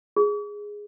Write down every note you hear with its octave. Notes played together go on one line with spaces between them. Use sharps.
G#4